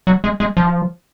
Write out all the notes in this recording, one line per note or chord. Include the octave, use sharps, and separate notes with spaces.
F#3
G#3
G#3
F3